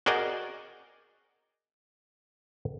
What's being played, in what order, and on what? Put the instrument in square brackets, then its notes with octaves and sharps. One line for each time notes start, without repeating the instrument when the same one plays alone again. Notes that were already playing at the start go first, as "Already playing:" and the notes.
[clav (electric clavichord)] F#4 G#4 A#4 D5 D#5 G5